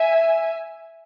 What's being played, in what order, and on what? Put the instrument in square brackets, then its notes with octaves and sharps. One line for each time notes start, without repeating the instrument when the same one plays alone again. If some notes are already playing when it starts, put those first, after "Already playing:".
Already playing: [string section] E5 G#5